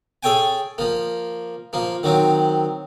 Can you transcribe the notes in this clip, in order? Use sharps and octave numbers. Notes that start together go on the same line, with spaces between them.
G#4 A4 C#5 G5 G#5
F3 A#3
F3 A#3
D#3 F#3 C4